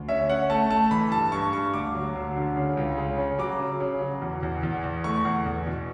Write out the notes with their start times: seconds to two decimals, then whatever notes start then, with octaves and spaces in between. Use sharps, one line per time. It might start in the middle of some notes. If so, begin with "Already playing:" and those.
Already playing: D2
0.08 C#4 E5
0.29 C#4 F#5
0.50 A3 A5
0.70 A3 A5
0.91 E3 B5
1.12 G2 A5
1.32 G2 C#6
1.53 G2 C#6
1.74 D2 D6
1.95 F#3
2.15 D2
2.36 D3
2.56 C#3
2.77 C#2
2.98 C#3
3.18 C#3
3.39 F#3 D6
3.60 C#3
3.80 C#3
4.01 F#3
4.22 E2
4.43 E2
4.63 E2
4.84 E2
5.04 A3 C#6
5.25 E2
5.46 E2
5.66 B2